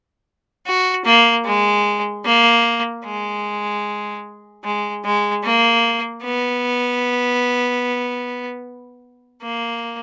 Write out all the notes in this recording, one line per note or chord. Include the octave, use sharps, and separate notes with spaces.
F#4
A#3
G#3
A#3
G#3
G#3
G#3
A#3
B3
A#3